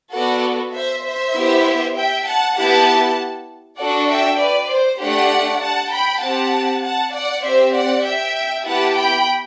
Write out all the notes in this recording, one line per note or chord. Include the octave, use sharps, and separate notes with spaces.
B3 F#4 A4 D5 F#5
C5 E5
C5 E5
B3 E4 G4
E5 G5
F#5 A5
B3 E4 G4 F#5 A5
D4 F#4 A4 D5 F#5
E5 G5
B4 D5
C5
A3 D4 G4 D5 F#5
F#5 A5
G5 B5
C4 G4 F#5 A5
F#5 A5
D5 F#5
C4 G4 C5 E5
D5 F#5
E5 G5
B3 E4 G4 F#5 A5
G5 B5